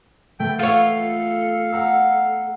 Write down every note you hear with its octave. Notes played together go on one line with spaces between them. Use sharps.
A3 B3 G5
F4 A4 C#5 F5
F#5 A#5 E6